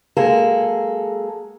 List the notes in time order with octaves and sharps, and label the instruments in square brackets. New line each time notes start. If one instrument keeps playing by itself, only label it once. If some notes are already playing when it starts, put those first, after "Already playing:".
[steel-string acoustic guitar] F#3 G#3 A#3 G#4 A4